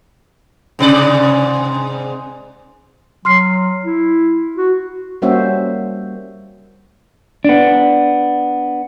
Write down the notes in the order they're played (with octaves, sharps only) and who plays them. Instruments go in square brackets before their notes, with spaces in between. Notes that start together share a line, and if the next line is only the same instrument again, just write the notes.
[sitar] G#2 C3 D5
[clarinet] F#3 [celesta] C6 F6 C7
[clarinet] E4
F#4
[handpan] G3 A#3 C#4 F#4 C5 E5
[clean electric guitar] B3 D4